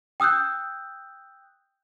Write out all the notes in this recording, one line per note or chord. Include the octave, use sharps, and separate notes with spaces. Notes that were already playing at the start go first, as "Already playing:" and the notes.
G5 D#6 E6 F#6 G6